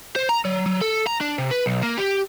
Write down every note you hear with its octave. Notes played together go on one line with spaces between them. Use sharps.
C5
A#5
F#3
F#3
A4
A#5
D4
C3
B4
B1
A#3
G4